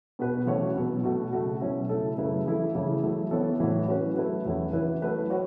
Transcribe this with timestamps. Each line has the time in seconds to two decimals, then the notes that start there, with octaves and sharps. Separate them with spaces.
0.19 B2 B3 F#4 B4
0.46 E3 A3 C#4 F#4 C#5
0.75 B2 F#3 B3
1.03 B2 A3 F#4
1.33 C#3 A3 F#4
1.61 B2 F#3 C#4 E4
1.89 C#3 A3 E4 A4
2.18 F#2 C#3 A3 E4 B4
2.46 E3 A3 E4 A4
2.75 C#3 E3 A3 C#4
3.03 F#3 A3 E4
3.31 E3 B3 A4 C#5
3.60 A2 E3 A3 F#4 C#5
3.88 F#3 C#4 F#4 B4
4.17 F#3 A3 E4 B4
4.45 E2 E3 A3 C#4 E4
4.73 E3 C#4 E4 B4
5.02 F#3 A3 F#4 B4
5.30 F#4 C#5